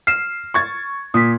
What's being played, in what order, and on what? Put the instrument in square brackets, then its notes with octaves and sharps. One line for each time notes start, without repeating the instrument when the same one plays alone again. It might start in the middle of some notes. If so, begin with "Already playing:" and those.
[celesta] F6 E7 [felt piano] C7
[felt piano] C#6 G#6 A6
[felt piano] A#2 [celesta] D#6 B6